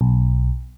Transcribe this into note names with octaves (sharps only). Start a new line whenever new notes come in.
B1